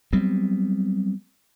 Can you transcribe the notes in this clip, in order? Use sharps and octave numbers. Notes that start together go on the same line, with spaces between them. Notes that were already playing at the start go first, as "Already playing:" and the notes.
F#3 G3 B3 C4